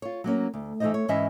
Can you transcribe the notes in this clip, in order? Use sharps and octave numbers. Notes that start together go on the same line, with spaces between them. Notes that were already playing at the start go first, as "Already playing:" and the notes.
F4 C#5
F#3 A#3 C#4
D2
E3 A3 C4 D#4 C5 D#5
C#5
G#2 E3 C#4 E4 D#5 E5